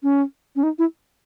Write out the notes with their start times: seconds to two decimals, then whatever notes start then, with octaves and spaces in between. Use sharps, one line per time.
0.03 C#4
0.56 C#4
0.63 D#4
0.79 E4